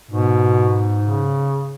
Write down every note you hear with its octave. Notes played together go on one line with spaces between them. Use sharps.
G#2 B2
C#3